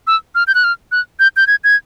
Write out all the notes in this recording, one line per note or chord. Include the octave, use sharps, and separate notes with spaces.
E6
F6
G6
F#6
F6
F#6
G6
G6
G#6
G#6